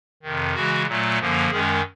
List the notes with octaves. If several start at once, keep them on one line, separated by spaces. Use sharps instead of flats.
F2 C3 D#3
C#3 E3 G#3 F#4
A#2 F#3 A3
F#2 D3 F3 A#3
F#2 D#3 G#3 C#4 G#4